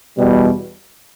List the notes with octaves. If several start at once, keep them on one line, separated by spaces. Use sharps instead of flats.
E2 B2 G3